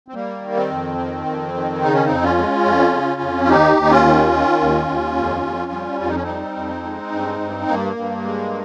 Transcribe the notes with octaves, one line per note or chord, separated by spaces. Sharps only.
C4
G3 A#3
D#3
C4
F2
D#3
F2
D#3
C#3 D#4
C#4
F2 C4 D#4
C#4 F4
G#3
F2
C#3
F2
F4
D#2 D#4 G4
D#2 D#4
C#4 F4
D#3
D#3
D#2
D#2
F2
F2
G3
F2 F4
D#4
C#4
C4 D#4
G3
F2
G#3
G2
G2
G2 A#3
G2
G#3